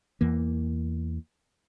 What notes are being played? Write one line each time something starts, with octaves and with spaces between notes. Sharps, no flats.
E2 E3 A#3